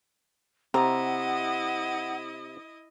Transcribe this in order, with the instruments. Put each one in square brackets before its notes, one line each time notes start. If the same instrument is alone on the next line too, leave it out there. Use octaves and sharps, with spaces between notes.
[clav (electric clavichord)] C3 [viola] E4 D#5 [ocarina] F#5 [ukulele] A#5